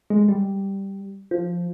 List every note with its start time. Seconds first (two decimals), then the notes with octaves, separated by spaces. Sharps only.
0.10 G#3
0.28 G3
1.31 F3